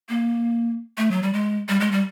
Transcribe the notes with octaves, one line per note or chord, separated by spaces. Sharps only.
A#3
A3
F#3
G3
G#3
G3
G#3
G3